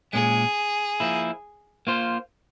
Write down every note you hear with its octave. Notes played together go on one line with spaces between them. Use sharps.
A#2 G#3 C#4 G#4
F3 A#3 E4
A#3 F4 C5